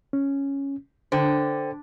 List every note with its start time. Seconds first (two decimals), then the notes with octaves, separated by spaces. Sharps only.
0.13 C#4
1.12 D3 C5 G5